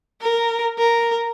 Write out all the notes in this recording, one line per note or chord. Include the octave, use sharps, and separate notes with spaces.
A#4
A#4